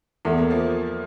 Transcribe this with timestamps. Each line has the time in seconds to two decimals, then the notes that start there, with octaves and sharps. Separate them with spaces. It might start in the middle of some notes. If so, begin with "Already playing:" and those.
0.25 E2 A3
0.38 A#3
0.50 F3 A3